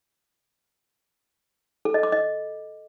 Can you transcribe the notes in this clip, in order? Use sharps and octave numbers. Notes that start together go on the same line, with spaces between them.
A4
D#5
D6
D#5